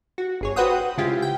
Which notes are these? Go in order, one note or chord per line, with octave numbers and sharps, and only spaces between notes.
F#4
G1 G#4 C#5
F#4 B4 C5 F#5 G5 D#6
C#3 G#3 E4 F4 G4
G5